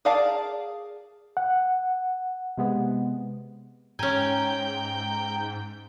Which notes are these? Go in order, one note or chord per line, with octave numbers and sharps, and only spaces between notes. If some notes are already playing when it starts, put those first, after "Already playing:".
G#4 A#4 D5 F5 A5
F#5
C3 G#3 B3
G#2 C#4 G5 G#5 A#5